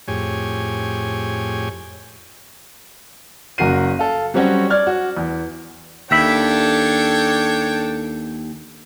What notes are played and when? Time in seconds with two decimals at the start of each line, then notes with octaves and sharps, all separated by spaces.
0.08 F2 A2 G4 G#4 C#5 G#5
3.58 F#1 F#3 F#4 A#4 C7 D#7
3.99 A4 F5
4.34 F#3 G3 C4 C#4 F#4 C#5
4.70 D5 F6 G#6
4.87 F#4
5.17 E2
6.11 D#2 D4 A4 C#5 E5 G5 B5